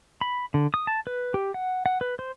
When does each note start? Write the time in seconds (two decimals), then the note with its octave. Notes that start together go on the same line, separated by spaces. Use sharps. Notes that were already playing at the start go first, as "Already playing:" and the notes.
0.21 B5
0.54 D3
0.74 D#6
0.87 A5
1.07 B4
1.34 G4
1.54 F#5
1.86 F#5
2.01 B4
2.19 C5